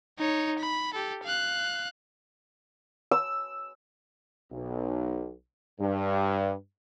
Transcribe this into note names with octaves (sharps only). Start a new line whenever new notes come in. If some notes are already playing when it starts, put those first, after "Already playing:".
D#4 C#5
B5
G4 A4
F5 F#6
E6
B1
G2